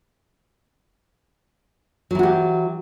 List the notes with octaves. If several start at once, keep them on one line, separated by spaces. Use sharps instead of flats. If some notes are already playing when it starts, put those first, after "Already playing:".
E3 F#3 F#4 G4